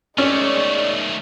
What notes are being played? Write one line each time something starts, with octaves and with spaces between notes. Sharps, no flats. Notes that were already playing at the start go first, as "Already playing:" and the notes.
D#3 G#3 A3 C#4 C#5 D5